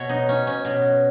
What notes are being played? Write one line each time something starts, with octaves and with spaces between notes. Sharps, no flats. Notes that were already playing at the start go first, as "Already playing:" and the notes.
Already playing: B2 C#5
D#4
C#4
C#4
B2